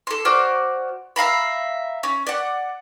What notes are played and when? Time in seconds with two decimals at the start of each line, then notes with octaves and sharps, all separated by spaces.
0.07 A4 C6
0.25 F#4 C5 D5 F6
1.16 E5 F5 A#5 B5
2.03 C#4
2.27 D5 F#5